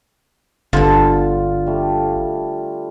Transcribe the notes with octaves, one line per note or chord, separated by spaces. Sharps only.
G1 D3 F4 A4
G3 A3